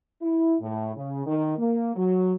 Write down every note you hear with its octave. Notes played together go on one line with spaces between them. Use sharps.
E4
A2
C#3
D#3
A#3
F#3